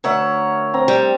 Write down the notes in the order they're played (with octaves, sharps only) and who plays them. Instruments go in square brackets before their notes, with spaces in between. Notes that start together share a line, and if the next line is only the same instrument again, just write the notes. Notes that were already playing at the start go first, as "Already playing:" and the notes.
[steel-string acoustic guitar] D2 F#5 [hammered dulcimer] A#4 C#5 E5
[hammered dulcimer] C4 A#5
[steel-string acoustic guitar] G3